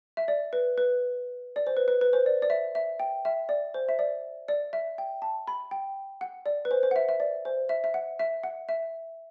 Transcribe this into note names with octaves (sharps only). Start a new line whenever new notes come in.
E5
D5
B4
B4
D5
C5
B4
B4
B4
C5
D5
D5
E5
E5
G5
E5
D5
C5
E5
D5
D5
E5
G5
A5
B5
G5
F#5
D5
B4
C5
C5
F#5
E5
E5
D5
C5
E5
E5
F#5
E5
F#5
E5